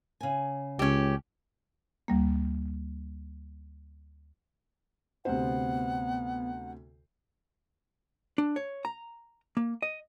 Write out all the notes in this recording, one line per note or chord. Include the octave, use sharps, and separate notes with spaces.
C#3 G#5
C#2 C#4 G4
D2 G3 A#3
D2 C3 B3 C5 F#5
D4
C#5
A#5
A#3
D#5